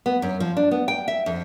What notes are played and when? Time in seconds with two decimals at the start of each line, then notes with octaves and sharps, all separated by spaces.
0.06 B3
0.22 F#2
0.40 F3
0.57 D4
0.71 B3
0.88 G5
1.08 E5
1.26 F2